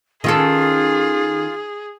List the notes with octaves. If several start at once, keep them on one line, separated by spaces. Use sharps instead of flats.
D#3 C#4 F4 G#4 A4